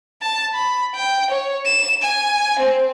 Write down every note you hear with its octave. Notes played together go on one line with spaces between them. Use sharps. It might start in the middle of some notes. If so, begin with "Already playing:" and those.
A5
B5
G5
C#5
E7
G#5
C4